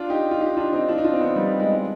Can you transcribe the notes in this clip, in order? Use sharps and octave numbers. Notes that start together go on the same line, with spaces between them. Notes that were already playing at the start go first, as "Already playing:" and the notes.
Already playing: D4 F4
D#4 G4
F4
D#4 G4
D4 F4
C4 D#4
D4 F4
D#4
D4 F4
C4
B3 D4
G3 B3
G#3
G#3